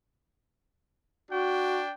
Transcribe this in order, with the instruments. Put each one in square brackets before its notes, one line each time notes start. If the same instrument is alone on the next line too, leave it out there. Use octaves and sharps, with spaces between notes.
[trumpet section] D4 G5 [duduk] F#4